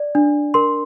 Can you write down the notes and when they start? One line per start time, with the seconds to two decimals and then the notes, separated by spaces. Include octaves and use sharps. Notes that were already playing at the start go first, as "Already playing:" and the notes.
Already playing: D5
0.15 D4
0.54 A#4 C6